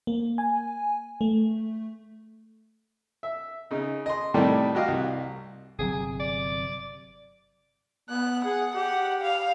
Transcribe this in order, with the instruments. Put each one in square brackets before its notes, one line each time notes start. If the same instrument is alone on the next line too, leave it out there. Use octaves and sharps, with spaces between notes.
[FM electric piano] A#3
G#5
A3
[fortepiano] E5
C#3 D#4
D#5 C6
A2 C3 D#3 G3 A3
F#4 G4 D#5 F5
C2
[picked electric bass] G1 C3 F#3 [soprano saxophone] G#4
[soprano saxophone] D5
[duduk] B3 [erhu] F#6
[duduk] G#4 [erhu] F#5
[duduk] G4 [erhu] F#5
[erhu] F5